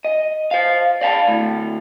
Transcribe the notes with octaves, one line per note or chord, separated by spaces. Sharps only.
D#5
C5 F5
D5 F5 G5 A5
D2 A2